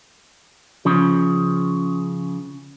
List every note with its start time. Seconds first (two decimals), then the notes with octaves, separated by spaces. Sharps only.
0.85 C#3 F3